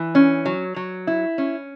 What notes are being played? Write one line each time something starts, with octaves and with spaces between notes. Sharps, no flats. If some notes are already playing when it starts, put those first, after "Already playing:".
Already playing: E3
C#4
F#3
F#3
E4
C#4